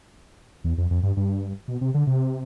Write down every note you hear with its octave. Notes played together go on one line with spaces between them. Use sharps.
E2
F2
F2
G2
G2
B2
C3
D3
C3